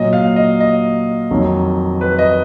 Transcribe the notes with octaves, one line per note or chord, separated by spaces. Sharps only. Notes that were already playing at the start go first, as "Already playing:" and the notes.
Already playing: A#2 F#3 D#5
F5
D#5
D#5
F2 D#3 F#3
B4
D#5